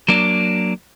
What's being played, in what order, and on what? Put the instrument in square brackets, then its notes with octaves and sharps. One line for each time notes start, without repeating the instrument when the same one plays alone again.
[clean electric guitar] F#3 A#3 D4